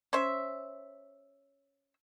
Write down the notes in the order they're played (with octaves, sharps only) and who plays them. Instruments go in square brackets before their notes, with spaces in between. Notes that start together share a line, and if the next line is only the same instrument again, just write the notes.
[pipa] C#4 C5 E5